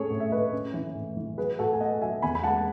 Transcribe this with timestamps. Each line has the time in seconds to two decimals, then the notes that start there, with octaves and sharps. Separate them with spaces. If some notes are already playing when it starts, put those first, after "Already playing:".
Already playing: A2 C#4 G#4 A4 C#5
0.10 A2
0.20 E5
0.32 A2 B4 D#5
0.53 C#4
0.74 E3
0.95 A2
1.17 E3
1.38 F#3 G#4 B4
1.59 A2 F#4 A4
1.73 G#5
1.80 B3 D#5 F#5
2.01 F#3 E5 G#5
2.22 E2 G#5 B5
2.35 B5
2.44 G#3 F#5 A5